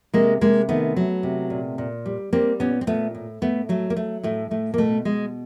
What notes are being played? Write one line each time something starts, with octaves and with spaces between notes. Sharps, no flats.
C3 G#3 A#3
C3 G#3 A#3
D#3 A3 B3
F#3
C3
A#2
A#2
G3
G3 A#3 C4
A#2 B3 C#4
C4
A#2 A3 B3
A2
A2 A3 B3
F#3 A3
A#3
F#3 A3
A2 A3
A2 A3
A#3
B2 A3
B2 G#3